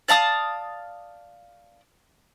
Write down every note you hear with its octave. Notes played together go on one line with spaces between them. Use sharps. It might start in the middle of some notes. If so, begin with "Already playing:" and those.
D5 F5 A5 D#6